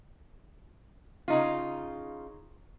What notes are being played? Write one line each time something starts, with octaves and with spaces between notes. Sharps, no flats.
C#3 D#4 F4